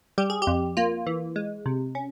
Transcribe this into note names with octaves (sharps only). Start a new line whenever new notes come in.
G3 G4
G#4
G4
F2
A#3 F4
E3
G#3
C3
C#4